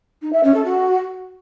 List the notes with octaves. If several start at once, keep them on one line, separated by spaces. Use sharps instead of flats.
D#4
E5
C#4
A4
F#4